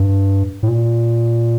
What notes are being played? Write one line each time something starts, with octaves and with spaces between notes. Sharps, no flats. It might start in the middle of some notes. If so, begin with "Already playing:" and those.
Already playing: G2
A2
A#2